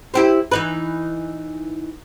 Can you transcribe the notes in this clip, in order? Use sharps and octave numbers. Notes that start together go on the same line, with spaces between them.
E4 G4 C5
E3 D#4 B4